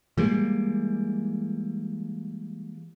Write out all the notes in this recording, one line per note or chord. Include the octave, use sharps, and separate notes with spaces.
E3 G3 G#3 A#3